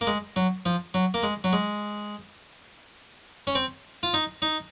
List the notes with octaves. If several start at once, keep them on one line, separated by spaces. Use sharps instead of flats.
A#3
G#3
F#3
F3
F#3
A#3
G#3
F#3
G#3
C#4
C4
F4
D#4
D#4